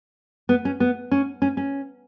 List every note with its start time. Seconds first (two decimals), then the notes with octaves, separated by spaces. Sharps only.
0.49 B3
0.65 C#4
0.80 B3
1.11 C#4
1.42 C#4
1.57 C#4